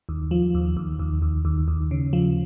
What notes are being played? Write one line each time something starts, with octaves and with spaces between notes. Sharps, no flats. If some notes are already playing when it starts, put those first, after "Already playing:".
D#2
F3
D#2
D#2
D#2
D#2
D#2
D#2
C#3
F3